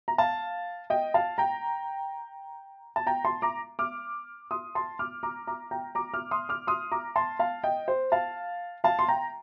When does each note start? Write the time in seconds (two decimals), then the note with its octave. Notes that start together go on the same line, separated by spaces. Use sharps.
0.08 A#5
0.18 F5 A5
0.90 D#5 G5
1.14 F5 A5
1.38 G5 A#5
2.96 A5
3.07 G5 A#5
3.25 A5 C6
3.42 A#5 D6
3.79 D6 F6
4.51 C6 D#6
4.75 A5 C6
4.99 D6 F6
5.23 A#5 D6
5.47 A#5 D6
5.71 G5 A#5
5.95 A#5 D6
6.14 D6 F6
6.31 C6 D#6
6.49 D6 F6
6.67 C6 D#6
6.92 A#5 D6
7.16 A5 C6
7.39 F5 A5
7.63 D#5 G5
7.88 C5
8.12 F5 A5
8.84 F5 A5
8.99 C6
9.08 G5 A#5